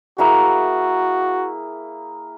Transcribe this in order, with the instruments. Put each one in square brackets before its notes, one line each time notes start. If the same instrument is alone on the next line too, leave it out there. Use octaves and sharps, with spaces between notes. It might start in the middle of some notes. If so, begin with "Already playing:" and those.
[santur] A#3 E4 G#4 [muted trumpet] F#4